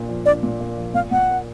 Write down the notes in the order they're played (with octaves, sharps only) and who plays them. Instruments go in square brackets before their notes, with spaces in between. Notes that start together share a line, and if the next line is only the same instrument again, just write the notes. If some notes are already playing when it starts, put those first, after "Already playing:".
Already playing: [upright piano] A#2 A#3 D4
F3
[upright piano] D4 [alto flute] D5
[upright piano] A#2
A#3
F3
[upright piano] A#2 [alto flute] F5
[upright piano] A#2 [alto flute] F#5
[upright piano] A#3